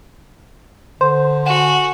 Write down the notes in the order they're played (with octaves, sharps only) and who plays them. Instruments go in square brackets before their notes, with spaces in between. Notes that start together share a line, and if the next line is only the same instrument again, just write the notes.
[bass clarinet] D3 [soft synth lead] C5 [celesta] C6
[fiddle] F#4 [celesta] F#5 E7 [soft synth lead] G#5